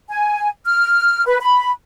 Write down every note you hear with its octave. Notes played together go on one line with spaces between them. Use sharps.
G#5
F6
B4
B5